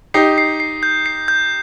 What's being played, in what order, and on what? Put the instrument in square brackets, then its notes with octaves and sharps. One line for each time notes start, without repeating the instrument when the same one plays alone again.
[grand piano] D#4 G4 [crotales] C7
[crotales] C7
C7
G6
C7
G6